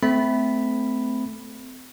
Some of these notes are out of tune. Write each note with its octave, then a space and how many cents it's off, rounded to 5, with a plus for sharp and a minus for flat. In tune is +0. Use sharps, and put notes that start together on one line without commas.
A3 +0 C4 -30 B5 +0